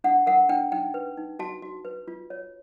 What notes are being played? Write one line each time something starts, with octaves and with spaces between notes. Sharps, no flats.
D4 F#5
A#4 F#5
D4 G5
D#4 G5
B4
D#4
F#4 A5
F#4
B4
F4
C#5